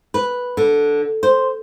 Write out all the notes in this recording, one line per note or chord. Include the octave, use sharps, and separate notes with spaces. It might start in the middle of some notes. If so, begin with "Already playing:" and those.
B4
D3
C5